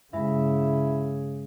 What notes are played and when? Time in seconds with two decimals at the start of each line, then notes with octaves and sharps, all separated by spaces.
0.13 G2 C#3 G#3 E4